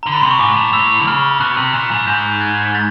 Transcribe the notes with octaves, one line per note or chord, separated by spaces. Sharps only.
D3 A#5
B5
C3 C6
C#6
G#2 D6
A2
A2 E6
D3
C#3 F6
B2 F#6
C3
A#2 F#6
G#2
G#2 G6
F#6 G#6
G6 A6